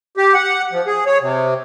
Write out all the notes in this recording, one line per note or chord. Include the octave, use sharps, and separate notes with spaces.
G4
F#5
F3
G#4
C#5
C3